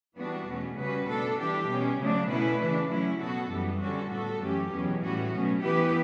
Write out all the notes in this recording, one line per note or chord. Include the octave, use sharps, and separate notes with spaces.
E3 G3 B3 D4 F#4
E2 B2 A3 C#4
C#3 G3 C#4 F#4 B4
B2 A3 D4 A4
E3 G3 D4 G4
B2 G3 C#4
C#3 F#3 A3 D4
B2 A3 C#4 E4 B4
C#3 E3 A3 D4
F#3 A3 C#4 E4
B2 F#3 B3 F#4 A4
F#2 E3 G3 B3
D3 G3 C#4 F#4 A4
A2 G3 B3 F#4 A4
F#2 E3 A3 C#4 G4
E2 B2 F#3 C#4
A2 E3 G3 C#4 F#4
B2 F#3 A3 C#4
E3 B3 E4 G4 B4